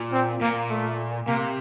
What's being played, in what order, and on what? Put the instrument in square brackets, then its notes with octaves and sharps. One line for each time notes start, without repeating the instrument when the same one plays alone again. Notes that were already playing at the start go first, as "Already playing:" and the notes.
Already playing: [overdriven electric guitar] A#2
[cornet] C4
[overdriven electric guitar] A#2 [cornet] A#3
[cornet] A3
[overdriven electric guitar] C3 [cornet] A#3